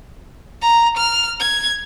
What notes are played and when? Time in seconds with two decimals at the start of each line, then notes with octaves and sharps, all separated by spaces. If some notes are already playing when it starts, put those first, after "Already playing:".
0.62 A#5
0.97 F6
1.40 G#6